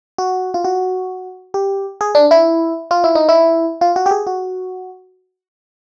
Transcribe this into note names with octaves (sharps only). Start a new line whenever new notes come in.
F#4
F4
F#4
G4
G#4
D4
E4
F4
E4
D#4
E4
F4
F#4
G4
G#4
F#4